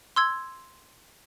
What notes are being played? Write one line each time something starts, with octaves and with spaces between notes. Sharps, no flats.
C6 E6 G#6